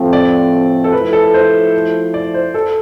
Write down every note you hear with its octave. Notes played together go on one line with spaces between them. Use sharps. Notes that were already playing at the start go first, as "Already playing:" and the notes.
Already playing: A2 F3 A3 C4
D5
A4
F3 A3 E4 B4
A4
C5
D5
C5
A4